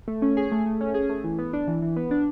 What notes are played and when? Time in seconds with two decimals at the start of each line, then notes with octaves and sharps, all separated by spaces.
0.08 A3
0.22 C#4
0.37 G#4
0.52 A3
0.66 A3
0.81 C#4
0.94 G#4
1.09 A3
1.24 E3
1.38 B3
1.53 D4
1.68 E3
1.82 E3
1.96 B3
2.11 D4